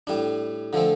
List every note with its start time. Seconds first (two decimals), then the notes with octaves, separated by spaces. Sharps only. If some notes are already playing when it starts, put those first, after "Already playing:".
0.07 A2 G3 D4
0.73 D3 F3 A3 C4